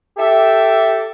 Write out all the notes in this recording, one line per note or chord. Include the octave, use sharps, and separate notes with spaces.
G4 A4 E5